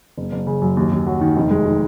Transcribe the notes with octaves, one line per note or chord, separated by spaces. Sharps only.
F#1
F#1
C#3
F#2
D#2
D#2
F#3
D#3
F1
G#3
D#3